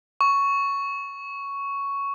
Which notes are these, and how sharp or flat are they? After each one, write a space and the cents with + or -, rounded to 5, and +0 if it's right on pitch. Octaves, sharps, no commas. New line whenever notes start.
C#6 +5